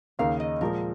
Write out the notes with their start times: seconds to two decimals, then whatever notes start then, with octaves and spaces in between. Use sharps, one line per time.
0.19 D#2 C#3 A#3 D#4 A#4 F5
0.40 D#5
0.61 A#2 F3 G#3 A#4